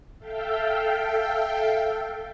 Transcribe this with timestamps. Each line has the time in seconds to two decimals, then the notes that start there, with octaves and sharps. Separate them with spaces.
0.18 A4 E5 F5 G5